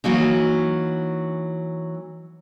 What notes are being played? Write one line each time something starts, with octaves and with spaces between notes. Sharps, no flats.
E3 F#3 A#3 D#4